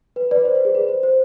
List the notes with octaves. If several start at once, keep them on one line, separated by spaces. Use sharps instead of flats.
B4
B4 D5
C5
B4
G#4
B4
C5
C5